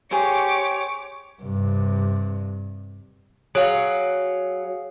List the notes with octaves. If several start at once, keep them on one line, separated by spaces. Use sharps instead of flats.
G4 G#4 C5 C#5 D6
G2 C3
F#3 G#4 F5